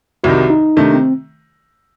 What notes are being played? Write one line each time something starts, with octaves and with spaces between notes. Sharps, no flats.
C2 C3 D#3 F#4
D#4
C3 D#3 A3 D4
C4